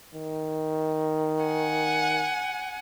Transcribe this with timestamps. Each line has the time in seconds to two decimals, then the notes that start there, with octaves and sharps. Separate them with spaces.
0.14 D#3
1.43 F#5 G#5